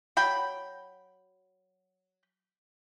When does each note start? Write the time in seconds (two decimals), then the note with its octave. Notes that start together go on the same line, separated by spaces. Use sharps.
0.17 F#3 G5 B5